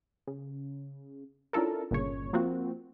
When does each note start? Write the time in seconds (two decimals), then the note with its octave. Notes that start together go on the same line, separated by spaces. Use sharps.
0.27 C#3
1.53 C#4 D4 E4 F4 A4 A#4
1.91 G1 A#2 C#3 C#5
2.33 F3 A#3 C4 F4 F#4